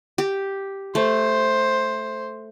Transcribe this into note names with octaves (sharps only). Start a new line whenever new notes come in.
G4
A3 C5